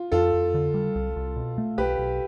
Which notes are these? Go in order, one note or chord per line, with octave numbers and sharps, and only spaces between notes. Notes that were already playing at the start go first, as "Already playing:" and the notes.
Already playing: F4
F2 F4 A4
F2
D3
G3
C2
C2
B2
A3
B1 G4 B4
B1